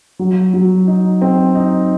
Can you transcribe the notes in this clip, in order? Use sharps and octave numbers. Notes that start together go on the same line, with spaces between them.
F#3
F#3
D#4
C4
D#4